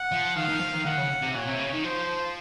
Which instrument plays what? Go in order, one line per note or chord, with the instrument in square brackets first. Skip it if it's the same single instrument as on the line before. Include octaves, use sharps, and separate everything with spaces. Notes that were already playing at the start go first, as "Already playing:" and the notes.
Already playing: [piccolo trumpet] F#5
[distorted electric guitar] F3
[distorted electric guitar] D#3 [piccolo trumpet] F5
[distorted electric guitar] D#3
F3
D#3
[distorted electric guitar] D#3 [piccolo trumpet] F#5
[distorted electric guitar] C#3
C3
[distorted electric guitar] A#2 [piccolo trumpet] C#5
[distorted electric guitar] C3
C#3
D#3
[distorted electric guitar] F3 [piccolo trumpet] C5